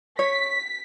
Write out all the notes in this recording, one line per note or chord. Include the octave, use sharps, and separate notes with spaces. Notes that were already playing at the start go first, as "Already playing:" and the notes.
C#5 B6